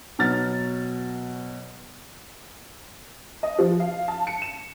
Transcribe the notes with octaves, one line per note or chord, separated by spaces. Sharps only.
B2 F#3 F6 A6
D#5
F3
F5
A5
C#7
E7